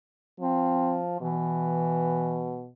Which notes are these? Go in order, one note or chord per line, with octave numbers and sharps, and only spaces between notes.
F3 C4
B2 E3